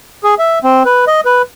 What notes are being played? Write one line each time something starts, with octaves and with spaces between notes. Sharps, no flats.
G#4
E5
C4
B4
D#5
B4